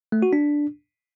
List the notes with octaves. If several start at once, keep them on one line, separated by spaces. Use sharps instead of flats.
A3
F#4
D4